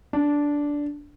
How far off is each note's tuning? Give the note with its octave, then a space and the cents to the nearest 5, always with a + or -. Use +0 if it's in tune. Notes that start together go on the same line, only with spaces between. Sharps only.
D4 -10